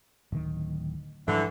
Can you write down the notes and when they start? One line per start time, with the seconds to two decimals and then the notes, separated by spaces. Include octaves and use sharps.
0.32 D1 D#3
1.28 G#2 D3 E3 F3 G3